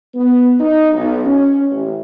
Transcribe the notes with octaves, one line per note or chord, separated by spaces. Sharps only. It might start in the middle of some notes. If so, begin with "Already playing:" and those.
B3
D#4
B1
C#4
A1